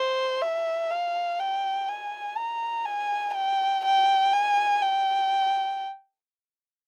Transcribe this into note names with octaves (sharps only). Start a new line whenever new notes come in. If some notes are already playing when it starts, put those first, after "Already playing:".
Already playing: C5
E5
F5
G5
G#5
A#5
G#5
G5
G5
G#5
G5